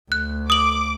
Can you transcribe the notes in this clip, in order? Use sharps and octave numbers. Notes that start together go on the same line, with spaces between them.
D2 F#6
D6 D#6 F#7